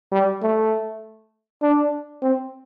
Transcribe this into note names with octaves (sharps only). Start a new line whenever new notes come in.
G3
A3
D4
C4